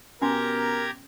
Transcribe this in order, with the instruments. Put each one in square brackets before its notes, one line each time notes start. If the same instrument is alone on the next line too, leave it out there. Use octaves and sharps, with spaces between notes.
[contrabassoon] B2 [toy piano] C#4 G#5 C6 [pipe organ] G4 A#5 G#6 [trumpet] A#4